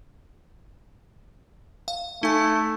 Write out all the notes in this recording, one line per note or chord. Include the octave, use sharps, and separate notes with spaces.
F5
A3 D#4 G#5